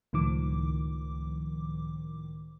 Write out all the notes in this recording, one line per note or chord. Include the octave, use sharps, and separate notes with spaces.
C#2 A2 D#3 F3 D6